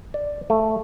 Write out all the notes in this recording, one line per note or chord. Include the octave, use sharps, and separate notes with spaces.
D5
A3